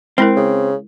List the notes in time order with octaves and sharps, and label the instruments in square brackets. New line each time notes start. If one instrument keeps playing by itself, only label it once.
[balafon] G#3 E4 A#4 [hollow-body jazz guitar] C4
[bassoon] C#3